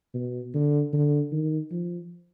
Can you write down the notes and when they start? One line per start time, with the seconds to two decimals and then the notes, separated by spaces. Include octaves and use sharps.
0.14 B2
0.54 D3
0.93 D3
1.32 D#3
1.71 F3